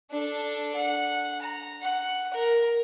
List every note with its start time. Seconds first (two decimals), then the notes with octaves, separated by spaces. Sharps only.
0.11 D4 A4
0.75 F#5
1.42 A#5
1.82 F#5
2.34 A#4